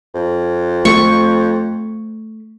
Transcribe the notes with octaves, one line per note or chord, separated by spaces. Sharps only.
F2
A3 C#6